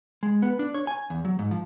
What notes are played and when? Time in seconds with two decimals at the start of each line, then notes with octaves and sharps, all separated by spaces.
0.23 G#3
0.42 B3
0.59 D4
0.74 C#5
0.87 G#5
1.10 E2
1.25 F#3
1.39 G#2
1.51 F3